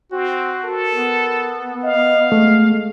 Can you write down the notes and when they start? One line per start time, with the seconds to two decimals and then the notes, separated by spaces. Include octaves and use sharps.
0.12 C4 F#4
0.64 A4 A#4
0.95 B3
1.84 D#5 F5
2.32 G#3 A3